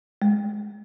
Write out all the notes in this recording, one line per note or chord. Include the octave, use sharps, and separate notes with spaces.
G#3